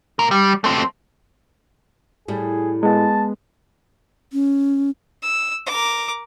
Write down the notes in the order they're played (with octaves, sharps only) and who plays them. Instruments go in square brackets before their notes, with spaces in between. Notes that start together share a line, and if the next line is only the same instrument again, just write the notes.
[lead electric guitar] A#2 A#4
G3
A3 C4
[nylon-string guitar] A2 G3 [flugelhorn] G#4
[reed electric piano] G#3 B3 [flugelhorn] A5
[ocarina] C#4
[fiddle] E6
A#4 D6